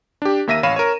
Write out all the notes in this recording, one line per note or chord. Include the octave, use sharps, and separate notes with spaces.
D4 G4
D#2 A#3 E5 A#6 D#7
A1 C#5 F5 B5 D#7 E7
A#4 C#5